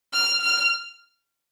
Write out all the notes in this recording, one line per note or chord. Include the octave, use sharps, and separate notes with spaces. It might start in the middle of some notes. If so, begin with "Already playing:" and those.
F6
F6